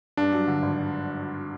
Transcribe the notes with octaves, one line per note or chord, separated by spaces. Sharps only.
G2 D4
F#3
D3
G#1